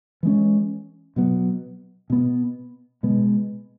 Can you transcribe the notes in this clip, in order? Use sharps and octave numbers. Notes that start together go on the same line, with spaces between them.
E3 G#3 C#4
B2 F#3 B3
B2 B3
B2 G#3 B3